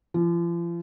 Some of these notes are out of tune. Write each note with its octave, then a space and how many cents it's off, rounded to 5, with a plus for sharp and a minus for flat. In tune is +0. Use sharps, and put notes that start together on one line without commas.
F3 -40